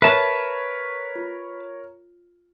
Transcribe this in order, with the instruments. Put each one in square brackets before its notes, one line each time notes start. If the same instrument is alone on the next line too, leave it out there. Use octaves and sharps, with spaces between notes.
[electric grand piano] A#4 C#5 [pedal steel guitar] B4 A5 [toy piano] E5
[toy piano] F4